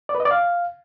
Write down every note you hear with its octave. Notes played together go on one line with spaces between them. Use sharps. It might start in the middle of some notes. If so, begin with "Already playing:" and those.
D5
B4
D#5
D5
F5